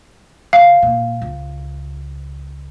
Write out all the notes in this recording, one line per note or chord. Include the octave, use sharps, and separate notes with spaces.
C#3 F5
A#2
C#2